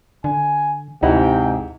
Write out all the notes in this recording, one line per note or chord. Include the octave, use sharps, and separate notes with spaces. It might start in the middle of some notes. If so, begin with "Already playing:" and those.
D3 G#5
D2 G#2 C3 D#4 E4 F#5 G5